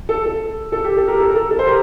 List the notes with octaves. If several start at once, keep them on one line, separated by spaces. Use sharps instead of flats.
A4
A4
A4
G4
A4
G4 A#4
A4
A#4
A4
A4
C5
G4 A#4